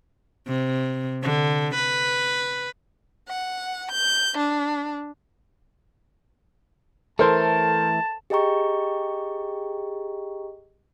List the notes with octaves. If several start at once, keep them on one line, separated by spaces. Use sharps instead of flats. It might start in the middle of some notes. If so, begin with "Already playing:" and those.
C3
D3
B4
F#5
G6
D4
E3 A3 A4 A#4 C5 A5
G4 G#4 D#5 G5 A#5 C#6